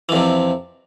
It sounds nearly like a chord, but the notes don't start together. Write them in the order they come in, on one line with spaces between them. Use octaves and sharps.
E3 F2 C3